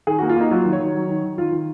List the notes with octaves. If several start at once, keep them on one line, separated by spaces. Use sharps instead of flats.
D#3 G#4
F#4
A#3
F4
A#3 D#4
F#3 F4
D#3
C#5
D#3
F#3
D#3
D#3
D#3 F4
D#3